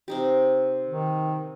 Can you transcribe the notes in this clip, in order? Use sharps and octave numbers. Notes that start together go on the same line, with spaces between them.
C3 D#4 G4
D#3